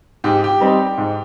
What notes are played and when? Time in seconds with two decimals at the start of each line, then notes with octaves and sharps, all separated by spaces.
0.24 G#2 G4
0.44 G4
0.60 G3 C4 D#4
0.98 G#2